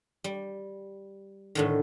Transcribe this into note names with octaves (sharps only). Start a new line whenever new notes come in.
G3
A2 D3 D#3